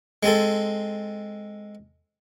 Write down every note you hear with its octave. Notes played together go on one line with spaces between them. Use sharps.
G#3 C4 G#4 A4